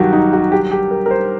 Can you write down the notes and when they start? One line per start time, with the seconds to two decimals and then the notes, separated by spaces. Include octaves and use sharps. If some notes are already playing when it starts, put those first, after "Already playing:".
Already playing: G2 D#3 F#3 F#4 G4
0.13 D#4
0.33 F#4
0.52 G4
0.71 G4
0.91 A#4
1.06 A#4
1.11 C5